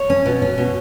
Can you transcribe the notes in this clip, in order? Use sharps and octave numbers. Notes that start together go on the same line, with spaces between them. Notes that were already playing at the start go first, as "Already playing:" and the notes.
Already playing: C#5
C#4
B2
C#4
B2